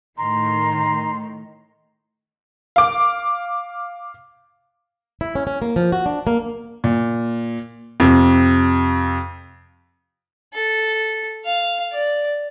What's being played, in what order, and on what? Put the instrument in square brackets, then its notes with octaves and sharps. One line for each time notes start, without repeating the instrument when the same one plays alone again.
[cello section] A2 D#3 [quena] A#5 [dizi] C6
[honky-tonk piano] F5 D6
[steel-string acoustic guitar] E4
C#4
C#4
A#3
F3
F#4
D4
A#3
[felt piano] A#2
F2 C3
[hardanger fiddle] A4
F5
D5